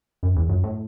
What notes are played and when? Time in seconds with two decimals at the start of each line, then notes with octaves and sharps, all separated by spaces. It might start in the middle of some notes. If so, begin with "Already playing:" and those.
0.23 F#2
0.36 E2
0.49 F#2
0.64 A2